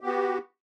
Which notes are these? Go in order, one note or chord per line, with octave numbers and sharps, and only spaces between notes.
B3 F#4 G4